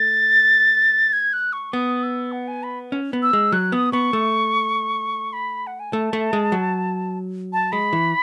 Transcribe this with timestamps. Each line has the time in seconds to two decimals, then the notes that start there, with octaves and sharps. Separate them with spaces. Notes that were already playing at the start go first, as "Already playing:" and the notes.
Already playing: A3 A6
1.13 G#6
1.33 F#6
1.53 C#6
1.73 B3 D#6
2.03 E6
2.32 F#5
2.48 G#5
2.63 B5
2.92 C#4
3.13 B3
3.23 E6
3.33 G#3
3.52 F#3 F#6
3.72 B3 D#6
3.92 B3 C#6
4.13 A3
5.33 B5
5.67 F#5
5.80 G#5
5.92 A3 A5
6.13 A3
6.33 G#3
6.52 F#3
7.53 A5
7.72 G#3 B5
7.93 E3